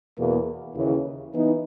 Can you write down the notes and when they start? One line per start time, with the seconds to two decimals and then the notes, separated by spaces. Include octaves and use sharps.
0.18 E2 B2 A#3
0.75 D#2 C#3 E3
1.33 E3 B3 D#4